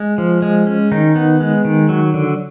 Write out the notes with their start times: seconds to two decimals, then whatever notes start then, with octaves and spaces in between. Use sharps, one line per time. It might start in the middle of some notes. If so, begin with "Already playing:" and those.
Already playing: G#3
0.18 F3
0.42 G#3
0.67 C#4
0.91 D#3 D#4
1.16 B3
1.40 G#3
1.65 D#3
1.89 F#3
2.14 D3